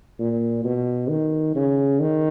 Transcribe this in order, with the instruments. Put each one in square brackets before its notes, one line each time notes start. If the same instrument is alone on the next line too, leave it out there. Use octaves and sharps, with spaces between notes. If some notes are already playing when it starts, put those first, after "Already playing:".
[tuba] A#2
B2
D#3
C#3
D#3